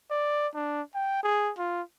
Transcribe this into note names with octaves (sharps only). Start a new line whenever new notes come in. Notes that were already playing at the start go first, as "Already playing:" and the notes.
D5
D4
G5
G#4
F4